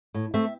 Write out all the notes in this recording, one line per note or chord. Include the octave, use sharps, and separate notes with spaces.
A2
A3 C4 E5